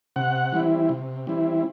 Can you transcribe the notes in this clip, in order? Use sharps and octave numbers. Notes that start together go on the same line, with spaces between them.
C3 F#5
E3 G3 C4 E4
C3
E3 G3 C4 E4